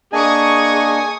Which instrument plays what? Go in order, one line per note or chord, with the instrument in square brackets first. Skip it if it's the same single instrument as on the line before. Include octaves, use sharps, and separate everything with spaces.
[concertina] A#3 D4 D#5 [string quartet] G#4 C#6 D#6 [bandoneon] G#5